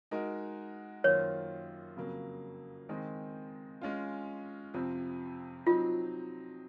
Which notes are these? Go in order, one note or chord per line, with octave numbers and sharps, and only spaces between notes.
G#3 D#4 F#4 A#4
F#2 D#3 A#3 F4 C5 C#5
F2 C#3 F#3 A#3
D#3 G#3 C4 D#4
G#3 C#4 F4
F2 C3 F3 C4
F#3 C4 D#4 F4